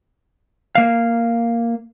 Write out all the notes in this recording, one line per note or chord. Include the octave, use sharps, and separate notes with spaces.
A#3 F5